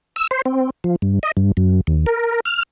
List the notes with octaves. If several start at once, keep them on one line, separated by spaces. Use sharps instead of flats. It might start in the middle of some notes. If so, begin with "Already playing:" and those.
E6
C5
C4
F3
G2
D#5
G2
F#2
D#2
A#4
F6